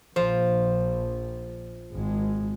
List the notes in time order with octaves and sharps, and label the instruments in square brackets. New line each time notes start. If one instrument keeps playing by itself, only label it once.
[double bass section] A#1 [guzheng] F3 [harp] C5
[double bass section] G#1 G#3